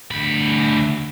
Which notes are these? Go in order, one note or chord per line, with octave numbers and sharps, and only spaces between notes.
D2 B5